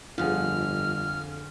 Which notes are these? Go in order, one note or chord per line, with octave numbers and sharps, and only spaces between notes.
G1 F2 D3 F4 G#4 F6